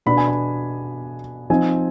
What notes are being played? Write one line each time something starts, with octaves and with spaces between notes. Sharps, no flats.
B2 B3 D4 B5
G#5
B5
F3 C4 D#4 G#5